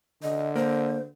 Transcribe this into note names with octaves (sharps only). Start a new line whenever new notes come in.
D3 D#5
A#3 C5